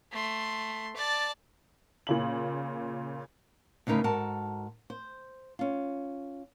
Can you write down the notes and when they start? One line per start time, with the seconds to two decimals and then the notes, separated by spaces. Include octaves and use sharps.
0.12 A3 C6
0.96 D5 A5
2.07 A#2 C#3 F#7
3.87 D2 C#3 D#4 A#4 B4
4.04 G#2 F#4 A4 A#4 A5
4.90 C5
5.59 C#4 F4